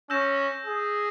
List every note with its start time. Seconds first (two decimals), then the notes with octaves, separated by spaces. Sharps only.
0.10 C#4 E6 G6 A#6 E7
0.66 G#4